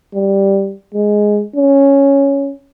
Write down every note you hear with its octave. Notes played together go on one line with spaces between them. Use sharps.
G3
G#3
C#4